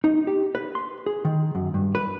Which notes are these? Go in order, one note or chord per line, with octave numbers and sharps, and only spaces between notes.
D#4
G4
B4
C6
G#4
D#3
F#2
G2
B4